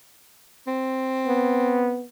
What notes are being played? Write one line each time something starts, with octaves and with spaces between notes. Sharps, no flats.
C4
B3